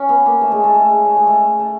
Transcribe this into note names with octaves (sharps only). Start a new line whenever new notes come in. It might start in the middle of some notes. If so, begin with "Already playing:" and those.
Already playing: C#4
B3
A#3
A3
G#3
A3
A3
G#3
A3
G#3
A3
A3